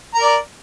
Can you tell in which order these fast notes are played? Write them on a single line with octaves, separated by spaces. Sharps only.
A#5 A#4 D5